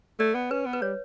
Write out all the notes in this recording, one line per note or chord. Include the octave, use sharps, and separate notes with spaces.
A3 D5
B3
C#4 B4
B3
B4
G3 C#5